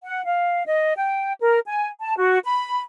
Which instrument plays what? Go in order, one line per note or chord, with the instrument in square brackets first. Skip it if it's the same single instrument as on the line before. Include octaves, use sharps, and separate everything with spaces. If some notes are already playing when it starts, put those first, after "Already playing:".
[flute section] F#5
F5
D#5
G5
A#4
G#5
A5
F#4
B5